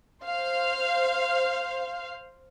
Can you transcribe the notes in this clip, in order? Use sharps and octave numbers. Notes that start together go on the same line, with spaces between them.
C5 F5